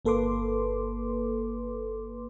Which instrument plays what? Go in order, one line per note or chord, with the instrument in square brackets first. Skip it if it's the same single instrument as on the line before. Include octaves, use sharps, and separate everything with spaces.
[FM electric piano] G1 A#3 A4 B4 C6 D6